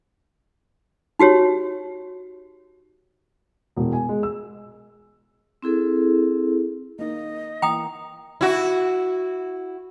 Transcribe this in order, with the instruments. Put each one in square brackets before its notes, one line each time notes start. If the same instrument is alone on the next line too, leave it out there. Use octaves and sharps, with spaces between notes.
[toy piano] D#4 F#4 G4 C#5
[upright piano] E1
G#5
G#3
E6
[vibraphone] C4 E4 G#4 A4
[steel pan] A#3 D#4 [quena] D#5
[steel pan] E3 A#3 [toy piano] G5 D#6 [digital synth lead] A#5
[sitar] E4 F#4